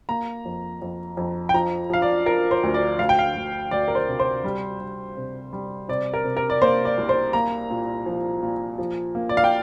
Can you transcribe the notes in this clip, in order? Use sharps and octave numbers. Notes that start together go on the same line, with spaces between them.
A#3 A#5
F2
F2
F2
G5
F3 A#5
F3 F5
D5
F3 A#4
C5
D2
D5
D2 F5
G5
F5
D2
D2 D5
A#4
C5
C3
C5
G3
G3
C3
G3
C3 D5
A#4
C3
A#4
D5
A#3 C5
D5
C2
C5
A#3 A#5
A#2
F3
A#2
F3
A#3
D5
F5
G5